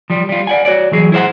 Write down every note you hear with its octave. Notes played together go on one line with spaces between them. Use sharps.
F3 G3
G3 F4
D5 F#5 G#5
F#4 C#5 D5
E3 F#3 G#4
E4 G#4 C5 D#5 F#5